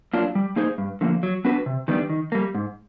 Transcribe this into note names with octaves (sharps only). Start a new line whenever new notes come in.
F#3 A#3 D4 F4
G3
A#3 D#4 G#4 C5
G2
D3 F3 A#3
F#3
B3 D4 F#4 B4
C3
D#3 G3 B3 D4
D#3
G3 A#3
G#2